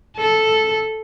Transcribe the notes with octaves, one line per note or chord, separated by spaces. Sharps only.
A4